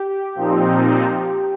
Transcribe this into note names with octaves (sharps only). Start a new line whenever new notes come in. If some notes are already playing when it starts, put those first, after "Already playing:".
Already playing: G4
A#2 F3 C4 D#4